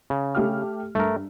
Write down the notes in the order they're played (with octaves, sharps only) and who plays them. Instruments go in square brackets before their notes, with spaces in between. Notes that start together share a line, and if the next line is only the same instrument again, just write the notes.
[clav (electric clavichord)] C#3
[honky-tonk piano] A3 G4 F6
[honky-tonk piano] G2 [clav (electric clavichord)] A3 A#4